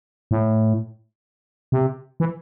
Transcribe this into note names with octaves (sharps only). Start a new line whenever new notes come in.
A2
C3
E3